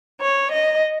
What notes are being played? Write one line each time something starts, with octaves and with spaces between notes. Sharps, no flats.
C#5
D#5